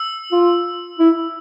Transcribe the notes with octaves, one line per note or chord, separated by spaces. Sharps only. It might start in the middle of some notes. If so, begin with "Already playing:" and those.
Already playing: E6
F4
E4